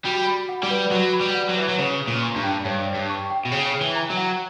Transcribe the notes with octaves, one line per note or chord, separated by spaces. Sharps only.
G3 F#4
B5
F#5
G3
B4
F#3 F#4
B5
G3
F#5
F#3
E3 B4
F#3
C#3 C#5
C#5
A#2
C#6
G2
G5
G2 C#5
C#5
G2
C#6
G5
B2
C#3 C#5
C#5
E3
A#5
F#3
F#5